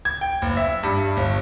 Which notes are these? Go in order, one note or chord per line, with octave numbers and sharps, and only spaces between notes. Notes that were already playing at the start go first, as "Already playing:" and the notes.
G#6
G5
F#1
E5
G2
G1